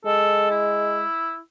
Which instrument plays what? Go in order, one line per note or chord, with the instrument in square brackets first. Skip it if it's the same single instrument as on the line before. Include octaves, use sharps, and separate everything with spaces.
[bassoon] G#3 [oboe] A4
[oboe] E4